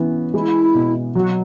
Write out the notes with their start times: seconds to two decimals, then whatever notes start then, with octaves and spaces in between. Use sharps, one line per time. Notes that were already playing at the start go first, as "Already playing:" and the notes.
Already playing: E3 B3 C#4
0.34 G#3 E4
0.74 B2
1.15 F#3 F#4